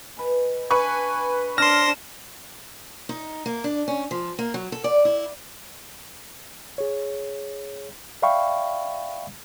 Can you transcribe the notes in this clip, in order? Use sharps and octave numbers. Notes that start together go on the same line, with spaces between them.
B4 D#5 G#5
D4 B4 F5 G#5 B5 C#6
D4 C5 C6 F6 A#6 E7
D#4
A#3
D4
C#4
F3
A#3
F#3
A4
D5
E4
G#4 C#5
D5 E5 F5 G5 B5 C#6